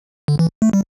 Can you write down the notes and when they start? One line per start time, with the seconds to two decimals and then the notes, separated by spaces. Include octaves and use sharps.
0.28 D3
0.39 E3
0.62 A3
0.73 G3